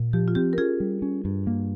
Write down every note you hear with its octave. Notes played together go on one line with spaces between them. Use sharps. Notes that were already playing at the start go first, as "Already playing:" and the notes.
Already playing: A#2
F3 G4
F4
C4 G4
A#4
C#4 F4 G#4
G3
C#4
G2
A#3